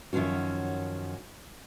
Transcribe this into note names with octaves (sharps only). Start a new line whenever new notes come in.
F#2 D#3 F3 C#4 F#4